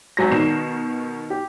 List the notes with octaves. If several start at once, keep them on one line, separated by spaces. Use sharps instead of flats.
G#1 F#3 A#6
B2 D#3 C7 E7
G4